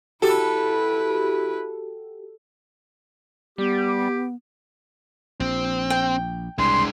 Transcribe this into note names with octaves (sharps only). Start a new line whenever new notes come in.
E4 F#4 G4 A4 B4
G3 B3 G4
A#1 C4
G5
C2 G#3 D4 C6